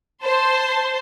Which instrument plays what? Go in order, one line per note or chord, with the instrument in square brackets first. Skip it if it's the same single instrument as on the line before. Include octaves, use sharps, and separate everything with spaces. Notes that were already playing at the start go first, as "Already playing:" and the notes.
[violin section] C5 A5 C6